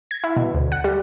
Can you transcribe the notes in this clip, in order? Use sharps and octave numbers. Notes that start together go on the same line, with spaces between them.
G#6
E4
B2
D2
F#5
G3